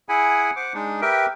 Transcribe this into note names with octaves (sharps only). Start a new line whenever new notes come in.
E4 G#4 F#5 G#5 B5
C5 F#5 D6
G#3 D4 D#4
G4 A#4 B4 E5 G5